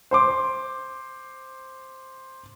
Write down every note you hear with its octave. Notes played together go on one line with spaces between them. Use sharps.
C5 C6 D6